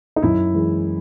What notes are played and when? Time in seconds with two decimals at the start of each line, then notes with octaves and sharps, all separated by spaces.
0.16 D#4
0.22 F#2 E4
0.54 E3 G#3